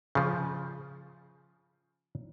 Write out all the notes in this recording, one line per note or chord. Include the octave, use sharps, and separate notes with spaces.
C#3 F3